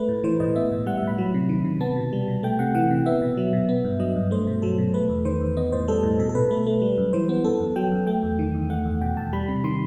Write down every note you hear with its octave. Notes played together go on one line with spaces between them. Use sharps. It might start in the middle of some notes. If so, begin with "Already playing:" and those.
Already playing: A3 B4
A2
E3 C5
A2 D#5
B3 E5
A2
G3 F#5
E5
A2 B5
F#3
C3
D#3
C3
B3 A5
B2
G3
B2
A3 G5
C3 F#5
E3 F#5
C3
B3 E5
B2
F#3
B2
B3
G2
F#3 D#5
G2
A3 C5
B2
F#3 A4
B2
A3 B4
E2
D#3 C5
E2
B3 D#5
A2 C5
G3 A4
A2
B2 A4
A4
B2 B4
A3
A3
G3
F#2
E3 C5
B3
B3 A4
F#2
F#3 G5
F#2
A3 G5
E2
D#3
E2
A3 F#5
E2
B2 G5
E2 A5
G3 B5
C3
D#3 C6